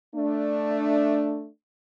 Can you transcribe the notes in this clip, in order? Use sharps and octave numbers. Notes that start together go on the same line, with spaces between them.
A3 D4